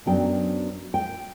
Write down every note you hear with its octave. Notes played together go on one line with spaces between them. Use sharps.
F#2 F#3 B3 D4 G5
G5